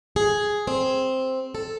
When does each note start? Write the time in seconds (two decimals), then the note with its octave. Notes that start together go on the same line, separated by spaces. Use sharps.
0.16 G#4
0.67 C4
1.55 A4